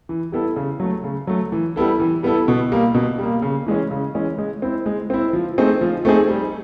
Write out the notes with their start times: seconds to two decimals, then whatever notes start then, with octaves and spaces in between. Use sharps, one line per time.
0.09 E3
0.32 G3 B3 E4 A4
0.56 C#3
0.80 F#3 A3
1.04 C#3
1.27 F#3 A3
1.52 E3
1.76 G3 B3 E4 A4
2.00 E3
2.23 G3 B3 E4 A4
2.48 B2
2.72 G3 A#3
2.94 B2
3.19 G3 A#3
3.42 C#3
3.66 E3 G#3 C#4
3.91 C#3
4.15 E3 G#3 C#4
4.38 G#3
4.62 C4 E4
4.86 G#3
5.10 C4 E4
5.33 F3
5.58 A3 C4 D#4 G#4
5.81 F3
6.05 A3 C4 D#4 G#4
6.29 G3